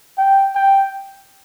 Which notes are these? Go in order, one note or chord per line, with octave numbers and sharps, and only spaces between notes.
G5
G5